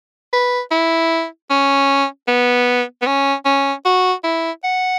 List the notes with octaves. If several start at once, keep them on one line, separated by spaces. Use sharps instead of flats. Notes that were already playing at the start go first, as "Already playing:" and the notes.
B4
E4
C#4
B3
B3
C#4
C#4
F#4
E4
F#5